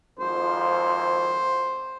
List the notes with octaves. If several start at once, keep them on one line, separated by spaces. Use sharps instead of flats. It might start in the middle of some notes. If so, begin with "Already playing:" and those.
G#1 F2 C5